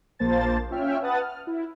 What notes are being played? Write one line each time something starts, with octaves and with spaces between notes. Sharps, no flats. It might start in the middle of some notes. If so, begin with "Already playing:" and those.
A#1 F3 A#3 C5 A5 A6
C#4 F4 C#5 E5 G5 F6
B4 F#5 A5 D#6 F#6 A6
F6
E4